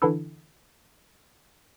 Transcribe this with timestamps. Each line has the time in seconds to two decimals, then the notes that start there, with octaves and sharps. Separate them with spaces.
0.02 D3 E3 D4 E4 A4